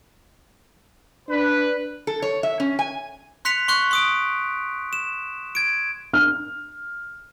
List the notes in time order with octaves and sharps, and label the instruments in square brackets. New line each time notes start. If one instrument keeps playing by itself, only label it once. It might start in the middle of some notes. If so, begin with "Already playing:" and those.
[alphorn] D4 [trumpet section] B4
[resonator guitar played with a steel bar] A4
C#5
E5
C#4
G#5
[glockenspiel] C6 F#6 B6 C#7 F7
C6 C#6 F#6
C6 D#6 D7
E7
G#6 D7
[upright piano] F6